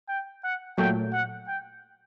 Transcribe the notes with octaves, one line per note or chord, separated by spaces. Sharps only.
G5
F#5
A#2 F#3 A3 G5
F#5
G5